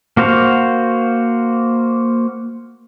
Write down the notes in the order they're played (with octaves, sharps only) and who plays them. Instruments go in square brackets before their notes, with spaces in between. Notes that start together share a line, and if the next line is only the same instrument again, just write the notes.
[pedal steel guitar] A#3 F#4 C5 F5